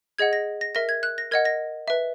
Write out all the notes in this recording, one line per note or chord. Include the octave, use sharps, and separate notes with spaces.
G#4 D#5 F#5 G#6
A#6
A#6
A#4 E5 A#6
G#6
F#6
A#6
A#4 D#5 F#5 G#6
A#6
B4 E5